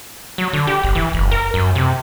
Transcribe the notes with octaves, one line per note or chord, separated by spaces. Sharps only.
F#3
D3
G4
G1
E3
F#1
A#4
F#2
C3